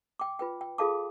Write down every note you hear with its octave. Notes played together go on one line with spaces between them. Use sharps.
G5 D6
F4 B4 G5
G5
F4 G#4 A4 F5 A5 D6